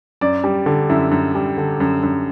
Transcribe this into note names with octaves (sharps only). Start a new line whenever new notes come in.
F#2 D5
G3
D3
F#2 E4
F#2
G3
D3
F#2
F#2